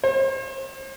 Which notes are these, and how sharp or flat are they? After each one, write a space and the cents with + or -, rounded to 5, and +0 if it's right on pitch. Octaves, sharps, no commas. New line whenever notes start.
C5 +45